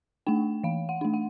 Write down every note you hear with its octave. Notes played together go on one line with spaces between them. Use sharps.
A3 D4 G5
E3 F5
F#5
A3 D4
F#5